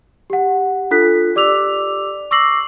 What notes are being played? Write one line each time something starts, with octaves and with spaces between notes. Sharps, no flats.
G4 F#5
D4 F4 A4 F#6 B6
G4 D5 D6 E6 F7
C#6 D6 E6 A#6 C7 F#7